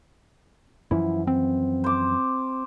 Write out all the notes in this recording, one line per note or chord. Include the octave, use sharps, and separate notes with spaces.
F#2 E3 F3 E4
C4
C5 D6